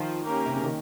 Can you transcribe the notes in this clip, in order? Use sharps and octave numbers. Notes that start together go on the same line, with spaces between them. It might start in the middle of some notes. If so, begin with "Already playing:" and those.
Already playing: D#3 F3 F4
A#3 C#4 G4 A#4
C3
C#3
D#3